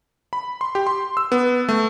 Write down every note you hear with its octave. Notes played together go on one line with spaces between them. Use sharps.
B5
C6
G4
C6
E6
B3
A3